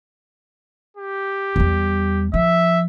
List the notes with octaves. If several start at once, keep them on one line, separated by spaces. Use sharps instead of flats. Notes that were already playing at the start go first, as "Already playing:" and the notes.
G4
E2 G3
F3 E5